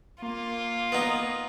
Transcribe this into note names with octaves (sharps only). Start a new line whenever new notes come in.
A#3 F4
B3 D#4